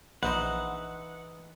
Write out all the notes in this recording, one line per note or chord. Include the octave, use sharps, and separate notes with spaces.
A#1 E3 D#4 B4 C5 D#5 F#5